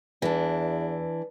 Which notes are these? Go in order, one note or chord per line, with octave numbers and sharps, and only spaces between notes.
E2 E3 D4